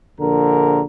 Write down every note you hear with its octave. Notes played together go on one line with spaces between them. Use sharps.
A#1 D3 A#4